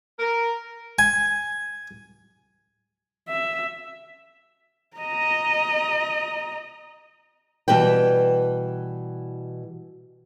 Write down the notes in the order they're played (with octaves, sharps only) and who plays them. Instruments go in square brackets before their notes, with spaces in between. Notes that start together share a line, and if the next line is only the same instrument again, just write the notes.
[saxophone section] A#4
[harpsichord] G#5
[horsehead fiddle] E5
D#5 A#5
[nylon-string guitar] B2 E3 G3 B4 G5